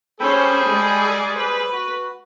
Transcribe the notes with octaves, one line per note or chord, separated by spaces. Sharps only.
G3 C#4 G#4 A4 C5 G5 B5
G#3 D5
B4 C5
F#4